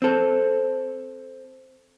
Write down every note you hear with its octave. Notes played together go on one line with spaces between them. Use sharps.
C4 A4